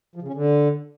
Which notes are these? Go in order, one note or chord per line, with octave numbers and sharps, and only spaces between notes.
F3
C#3
C#4
D3